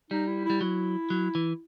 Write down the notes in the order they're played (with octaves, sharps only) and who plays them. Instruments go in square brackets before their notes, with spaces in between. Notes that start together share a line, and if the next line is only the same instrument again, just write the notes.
[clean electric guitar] G3 [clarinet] D#4
[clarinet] E4
E4
[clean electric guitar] G3
[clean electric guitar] F#3 [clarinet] E4
[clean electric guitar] F#3
E3